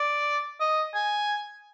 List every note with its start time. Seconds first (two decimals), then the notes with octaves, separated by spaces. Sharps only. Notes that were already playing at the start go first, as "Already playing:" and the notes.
Already playing: D5
0.60 D#5
0.95 G#5